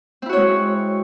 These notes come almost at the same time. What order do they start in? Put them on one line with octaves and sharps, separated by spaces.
C4 E4 F#4 C#5 G#3